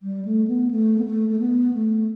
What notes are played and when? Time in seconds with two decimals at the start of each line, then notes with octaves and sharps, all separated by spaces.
0.03 G3
0.25 A3
0.48 B3
0.71 A3
0.98 B3
1.05 A3
1.29 A3
1.39 B3
1.74 A3